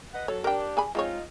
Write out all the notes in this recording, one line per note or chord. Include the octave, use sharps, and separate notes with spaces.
B4 D#5 F#5
F#3 A4 C#5
D4 G4 A#4 G5
G#4 G#5 B5
G#3 C4 D#4 F4 C#5